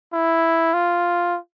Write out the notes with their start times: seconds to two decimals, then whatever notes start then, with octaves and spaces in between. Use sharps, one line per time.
0.13 E4
0.74 F4